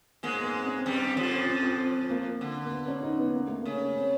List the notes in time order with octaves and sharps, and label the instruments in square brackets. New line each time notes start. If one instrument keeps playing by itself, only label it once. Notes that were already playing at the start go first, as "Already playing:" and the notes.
[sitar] G#2 G#3 [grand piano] A#3
[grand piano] B3
C4
C#4
C4
[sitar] G2 G3
[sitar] F2 F3 [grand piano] C#4
[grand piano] C4
C4
C4
A#3
[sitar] D3
[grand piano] A#3
B3
C#4
D#4
B3
A#3
A3
[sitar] C#3 [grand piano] A#3
[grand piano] C4